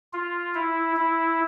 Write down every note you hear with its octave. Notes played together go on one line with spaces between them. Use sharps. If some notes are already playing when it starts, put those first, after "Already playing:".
F4
E4
E4